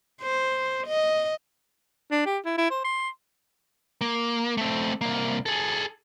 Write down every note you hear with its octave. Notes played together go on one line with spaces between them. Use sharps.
C5
D#5
D4
G4
E4
E4
C5
C6
A#3
A3 C4
C2 A#3
G#4 A4